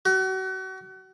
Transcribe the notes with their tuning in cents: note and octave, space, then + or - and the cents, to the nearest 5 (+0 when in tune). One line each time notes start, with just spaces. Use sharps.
F#4 +35